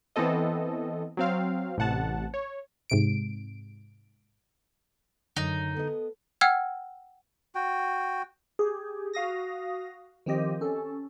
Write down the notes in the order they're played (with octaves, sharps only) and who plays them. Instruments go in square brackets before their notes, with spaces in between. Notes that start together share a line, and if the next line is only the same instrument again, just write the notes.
[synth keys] E3 B3 C4 A4 D#5
F#3 C4 F5
A1 C3 F#5 A5
C#5
[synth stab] G#2 C3 D7
[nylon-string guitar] F#2 [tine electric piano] D3 [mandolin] D#4
[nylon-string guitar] B3 D#5 [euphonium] A4
[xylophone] F#5 G5 E6 F6 G#6
[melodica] F#4 G5
[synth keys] G4 G#4
F#4 F5 D#6 A#6
D#3 F3 C4 G4 D#5
C#4 A4